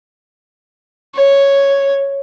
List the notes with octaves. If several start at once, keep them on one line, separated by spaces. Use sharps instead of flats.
C#5